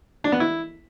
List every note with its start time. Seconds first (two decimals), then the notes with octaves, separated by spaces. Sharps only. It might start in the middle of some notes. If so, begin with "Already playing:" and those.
0.24 D4
0.32 B3
0.40 E4